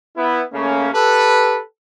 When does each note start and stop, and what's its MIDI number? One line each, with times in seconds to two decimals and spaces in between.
0.17 0.42 59
0.17 0.42 64
0.52 0.89 49
0.52 0.89 57
0.52 0.89 58
0.52 0.89 61
0.93 1.59 67
0.93 1.59 69
0.93 1.59 71